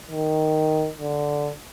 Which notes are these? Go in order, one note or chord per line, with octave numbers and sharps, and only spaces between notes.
D#3
D3